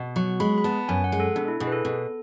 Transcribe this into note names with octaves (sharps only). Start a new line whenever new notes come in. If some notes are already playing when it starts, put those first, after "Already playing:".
Already playing: B2
F#3 C#6
G#3 B5
B5
B3 A5
F#2 G#5
F#5
G#3
A4
B2 D4
E4
B2 G#4
B4
A4
B2